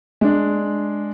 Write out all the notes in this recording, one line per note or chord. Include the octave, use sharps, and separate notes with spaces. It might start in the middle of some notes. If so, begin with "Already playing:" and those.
G#3 D4